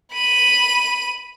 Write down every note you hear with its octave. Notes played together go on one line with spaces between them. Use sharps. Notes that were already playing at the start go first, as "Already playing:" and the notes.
B5 D#7